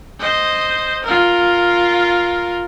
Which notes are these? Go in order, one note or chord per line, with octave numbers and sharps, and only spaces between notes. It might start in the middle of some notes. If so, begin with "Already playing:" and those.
C5 D#5
F4 A#4